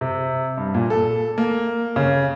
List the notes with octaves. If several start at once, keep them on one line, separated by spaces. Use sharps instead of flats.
C3
G2
A#2
A4
A#3
C#3